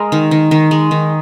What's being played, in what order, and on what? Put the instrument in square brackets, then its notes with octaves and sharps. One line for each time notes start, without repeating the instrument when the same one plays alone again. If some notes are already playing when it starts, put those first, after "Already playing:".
Already playing: [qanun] G#3 A#4
D#3
D#3
D#3
G#3
D#3